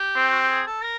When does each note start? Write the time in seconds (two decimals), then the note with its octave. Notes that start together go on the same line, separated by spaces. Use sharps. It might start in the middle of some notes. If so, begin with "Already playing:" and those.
Already playing: G4
0.16 C4
0.32 F#4
0.41 G4
0.49 G#4
0.67 A4
0.83 A#4